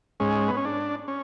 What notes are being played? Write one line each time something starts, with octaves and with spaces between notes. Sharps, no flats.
G#2 G#3 C#4
B3
C#4
D4
C#4